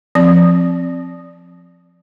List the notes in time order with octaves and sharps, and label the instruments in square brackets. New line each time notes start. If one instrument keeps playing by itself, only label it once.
[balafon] F3 C4 D5